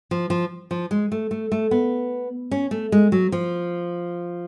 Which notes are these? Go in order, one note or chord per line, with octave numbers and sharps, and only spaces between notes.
F3
F3
F3
G#3
A3
A3
A3
B3
C#4
A3
G#3
F#3
F3